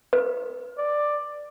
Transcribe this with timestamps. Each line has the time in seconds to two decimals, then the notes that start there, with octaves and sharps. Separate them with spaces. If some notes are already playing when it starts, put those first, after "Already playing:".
0.13 B4
0.78 D5